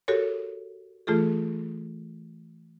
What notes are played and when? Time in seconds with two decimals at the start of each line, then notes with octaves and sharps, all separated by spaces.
0.08 F#4 G4 A4 A#4 C#5
1.07 E3 A3 F4 G#4 A4